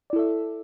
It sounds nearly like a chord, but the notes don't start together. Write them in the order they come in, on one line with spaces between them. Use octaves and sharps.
D5 E4 A4 E5